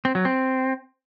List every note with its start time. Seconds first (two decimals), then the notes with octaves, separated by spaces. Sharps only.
0.05 C4
0.15 F#3
0.25 C4